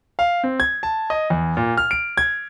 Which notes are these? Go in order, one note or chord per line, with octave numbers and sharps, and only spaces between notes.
F5
C4
G#6
A5
D#5
E2
A#2
F6
D7
G#6